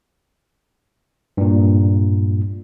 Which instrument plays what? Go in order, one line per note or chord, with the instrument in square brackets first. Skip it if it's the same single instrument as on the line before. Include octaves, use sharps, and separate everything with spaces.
[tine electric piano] G2 A#2